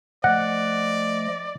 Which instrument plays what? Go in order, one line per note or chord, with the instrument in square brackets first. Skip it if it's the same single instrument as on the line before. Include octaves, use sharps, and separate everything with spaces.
[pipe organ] F3 A3 D#5 [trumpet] D5 [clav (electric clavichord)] F#5